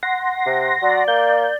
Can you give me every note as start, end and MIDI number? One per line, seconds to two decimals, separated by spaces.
0.03 1.04 78
0.03 1.04 84
0.03 1.04 94
0.46 0.72 48
0.82 1.02 54
0.82 1.58 74
1.08 1.47 58
1.08 1.56 91